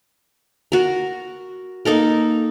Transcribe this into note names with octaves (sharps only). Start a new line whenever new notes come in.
F#4 A#4
A#3 D#4 A4 A#4